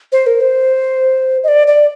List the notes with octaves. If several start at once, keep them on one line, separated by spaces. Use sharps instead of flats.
C5
A#4
C5
D#5
D5
D5